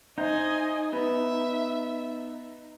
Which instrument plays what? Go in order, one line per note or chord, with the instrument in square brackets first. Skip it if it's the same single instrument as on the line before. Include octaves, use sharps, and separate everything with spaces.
[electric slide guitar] D#4 [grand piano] C5 E5 G6 [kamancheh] D#5 G#5
[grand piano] B3 [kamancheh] E5